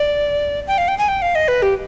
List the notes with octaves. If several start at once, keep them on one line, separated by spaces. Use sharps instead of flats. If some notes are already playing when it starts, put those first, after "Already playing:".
Already playing: D5
G5
F5
G5
G#5
G5
F5
D#5
B4
G4